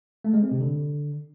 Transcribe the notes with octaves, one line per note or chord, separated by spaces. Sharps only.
A3
G#3
C4
C3
D3